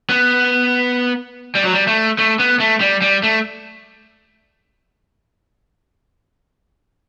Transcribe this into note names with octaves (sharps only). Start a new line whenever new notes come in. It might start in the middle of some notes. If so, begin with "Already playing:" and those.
B3
G3
F#3
G3
A3
A3
B3
A3
G3
G3
A3